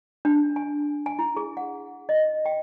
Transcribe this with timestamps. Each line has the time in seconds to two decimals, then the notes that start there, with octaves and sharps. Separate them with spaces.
0.25 D4
0.56 G#5
1.06 G#5
1.19 E4
1.36 G#4
1.57 F#5
2.09 D#5
2.46 G5